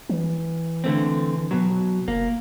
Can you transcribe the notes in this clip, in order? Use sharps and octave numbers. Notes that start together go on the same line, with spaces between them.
E3
D3 A3 C4
B2 F#3
F1 A#3